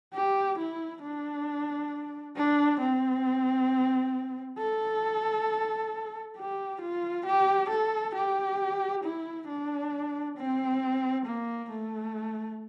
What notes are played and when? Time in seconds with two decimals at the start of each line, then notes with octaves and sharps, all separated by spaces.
0.14 G4
0.58 E4
1.03 D4
2.36 D4
2.81 C4
4.59 A4
6.37 G4
6.81 F4
7.26 G4
7.70 A4
8.15 G4
9.04 E4
9.48 D4
10.37 C4
11.26 A#3
11.70 A3